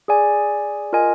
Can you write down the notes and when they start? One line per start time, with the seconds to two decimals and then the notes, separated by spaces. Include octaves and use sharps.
0.08 G#4 D5 G#5
0.93 F4 A#4 D#5 G#5